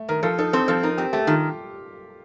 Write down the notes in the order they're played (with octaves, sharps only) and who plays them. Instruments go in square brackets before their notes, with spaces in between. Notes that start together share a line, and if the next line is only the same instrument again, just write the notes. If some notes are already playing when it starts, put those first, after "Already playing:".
Already playing: [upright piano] A3
[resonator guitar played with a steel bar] D#3 [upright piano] A#4
[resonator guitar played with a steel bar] F3 [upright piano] A4
[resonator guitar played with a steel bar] D#4 [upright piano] A4
[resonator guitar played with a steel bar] C4 [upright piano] A4
[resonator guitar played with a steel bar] F3 [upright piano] A4
[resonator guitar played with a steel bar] D#4 [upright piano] A#4
[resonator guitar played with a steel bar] C4 [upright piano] G4
[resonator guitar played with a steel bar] A3 [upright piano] G4
[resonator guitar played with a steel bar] D#3 [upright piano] F4